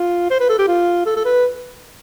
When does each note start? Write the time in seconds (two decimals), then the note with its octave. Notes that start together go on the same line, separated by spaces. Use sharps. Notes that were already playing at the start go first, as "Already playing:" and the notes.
Already playing: F4
0.31 C5
0.40 B4
0.49 A4
0.59 G4
0.68 F4
1.06 A4
1.16 A4
1.25 B4